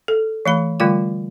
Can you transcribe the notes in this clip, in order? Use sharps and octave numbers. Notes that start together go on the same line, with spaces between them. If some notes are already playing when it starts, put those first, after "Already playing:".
A4
E3 A3 B5
D3 G3 A3 F4 G5